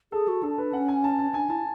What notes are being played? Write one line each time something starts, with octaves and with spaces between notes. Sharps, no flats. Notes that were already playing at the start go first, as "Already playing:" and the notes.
G#4 A4
F#4
D4 A4
B4
C#4 F#5
G#5
A5
A5
D4 G#5
E4 A5